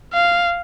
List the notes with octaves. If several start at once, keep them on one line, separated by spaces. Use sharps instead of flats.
F5